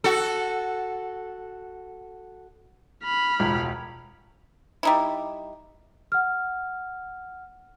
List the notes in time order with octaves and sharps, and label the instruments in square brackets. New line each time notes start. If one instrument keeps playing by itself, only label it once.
[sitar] F#4 A4
[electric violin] B5 F6
[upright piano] E1 C#2
[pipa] G3 D#4 E4
[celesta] F#5 F6